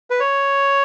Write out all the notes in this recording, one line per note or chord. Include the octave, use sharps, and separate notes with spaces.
B4
C#5